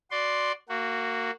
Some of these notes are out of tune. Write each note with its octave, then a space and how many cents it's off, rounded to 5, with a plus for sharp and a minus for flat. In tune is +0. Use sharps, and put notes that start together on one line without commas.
F#4 +0 D5 +0 C6 +0
A#3 -20 F#4 +0